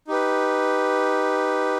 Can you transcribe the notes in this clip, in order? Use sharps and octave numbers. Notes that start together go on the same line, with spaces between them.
D#4 G4 B4